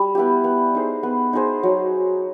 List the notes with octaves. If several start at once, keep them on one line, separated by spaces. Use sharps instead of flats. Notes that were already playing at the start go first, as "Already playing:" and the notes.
Already playing: G3
B3 E4 G4
B3
D#4 G#4 C5
B3
D#4 G#4 C5
F#3